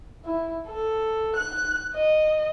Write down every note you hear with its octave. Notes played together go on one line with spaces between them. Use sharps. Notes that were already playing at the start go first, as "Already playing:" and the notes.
E4
A4
F#6
D#5